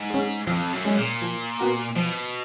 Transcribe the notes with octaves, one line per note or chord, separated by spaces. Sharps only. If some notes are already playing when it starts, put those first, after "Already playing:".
Already playing: G#2
G#3 C#4
F2 F3
F#2
G#3 C#4
A#2
F3
B3 F#4 A#4
B2 F3